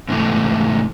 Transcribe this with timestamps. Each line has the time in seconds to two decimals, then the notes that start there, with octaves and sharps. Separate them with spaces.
0.09 G#2 C3 E3 A3